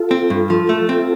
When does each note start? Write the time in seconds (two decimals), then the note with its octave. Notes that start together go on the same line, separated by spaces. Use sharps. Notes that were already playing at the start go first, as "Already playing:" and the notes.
Already playing: F4 A4
0.11 C4
0.30 G2
0.50 F3
0.69 A3
0.89 C4